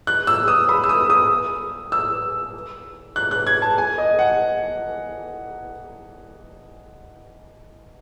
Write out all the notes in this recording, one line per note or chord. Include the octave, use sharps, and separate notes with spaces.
F#6
E6
D#6
B5
E6
D#6
D#6
E6
F#6
F#6
G#6
A5
G#5
D#5
F#5